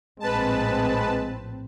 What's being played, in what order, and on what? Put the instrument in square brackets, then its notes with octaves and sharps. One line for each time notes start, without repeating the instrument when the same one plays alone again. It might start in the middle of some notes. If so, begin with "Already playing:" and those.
[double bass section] A#1 A2 C4 [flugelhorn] G#3 [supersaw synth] B4 A5